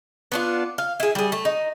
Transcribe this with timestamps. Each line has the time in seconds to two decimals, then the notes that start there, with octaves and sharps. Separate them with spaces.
0.32 B3 D4 F4
0.78 F5
1.00 E4 G#4
1.15 G3 G#4
1.32 A3
1.45 D#4